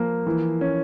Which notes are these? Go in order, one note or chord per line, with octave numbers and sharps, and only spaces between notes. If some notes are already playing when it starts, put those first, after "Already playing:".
Already playing: F3 A#3
E3
C#4